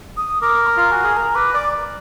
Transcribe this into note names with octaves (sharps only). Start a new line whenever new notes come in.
D#6
A#4 D6
A#5
F4
F#4 G#5
G#4
A#4 A#5
B4 D6
D5 D6